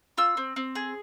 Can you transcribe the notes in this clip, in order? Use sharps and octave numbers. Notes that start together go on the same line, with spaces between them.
F4 E6
C4
C4
G#4